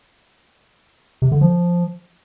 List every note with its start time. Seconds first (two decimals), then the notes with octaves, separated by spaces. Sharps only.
1.22 C3
1.32 D3
1.41 F3